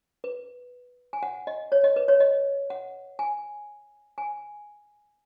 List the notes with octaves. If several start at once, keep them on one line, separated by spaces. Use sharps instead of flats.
B4
G#5
F#5
D#5
C#5
D#5
B4
C#5
D#5
F#5
G#5
G#5